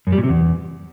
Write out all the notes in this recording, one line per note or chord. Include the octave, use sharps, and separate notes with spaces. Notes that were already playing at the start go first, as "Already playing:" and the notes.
F#2
G3
A#2
C3
E2